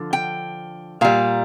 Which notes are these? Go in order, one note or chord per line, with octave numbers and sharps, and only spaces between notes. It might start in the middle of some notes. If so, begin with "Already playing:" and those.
Already playing: D3 F3
G5
A#2 G3 F5